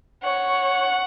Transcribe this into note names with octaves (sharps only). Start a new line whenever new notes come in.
C#5 F#5